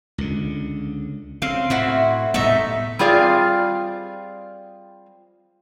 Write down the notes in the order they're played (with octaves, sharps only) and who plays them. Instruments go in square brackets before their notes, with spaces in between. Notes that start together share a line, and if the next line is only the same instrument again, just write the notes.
[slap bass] C#2 D3
[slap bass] C#3 [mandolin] C4 F5
[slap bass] A2 [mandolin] C4 E4 F#4
[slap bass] A2 G3 B3 [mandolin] A3 D#4 E5
[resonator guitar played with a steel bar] G3 C4 F4 G#4 D5 F5